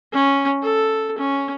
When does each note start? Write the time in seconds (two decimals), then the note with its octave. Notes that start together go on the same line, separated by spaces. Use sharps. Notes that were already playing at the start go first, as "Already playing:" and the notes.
0.13 C#4
0.63 A4
1.18 C#4